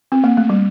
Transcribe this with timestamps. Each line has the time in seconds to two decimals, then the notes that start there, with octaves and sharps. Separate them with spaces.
0.12 C4
0.24 A#3
0.37 A3
0.50 G3